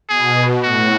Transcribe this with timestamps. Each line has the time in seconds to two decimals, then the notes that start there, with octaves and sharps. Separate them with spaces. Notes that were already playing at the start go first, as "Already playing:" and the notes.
0.09 B2 G#4
0.63 A2 F#4